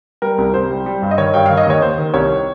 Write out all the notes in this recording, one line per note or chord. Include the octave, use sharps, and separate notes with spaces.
G3 A#4
C2
C2 C5
G3
G3
G2
D#5
D#3 C#5
G2 G5
D#3 F5
D#5
D#2 C#5
D#2 C5
D#3
C2 C#5